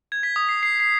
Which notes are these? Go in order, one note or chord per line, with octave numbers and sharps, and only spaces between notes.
G#6
B6
D#6
C7
C7
C7